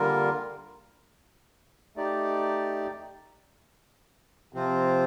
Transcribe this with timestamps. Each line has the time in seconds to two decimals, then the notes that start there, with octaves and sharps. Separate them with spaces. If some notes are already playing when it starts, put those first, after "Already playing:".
Already playing: D3 G3 A#3 F4 A#4
1.96 A3 D#4 G4 D5
4.53 C3 F3 C4 F4 C5